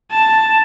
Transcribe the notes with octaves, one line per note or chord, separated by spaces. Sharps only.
A5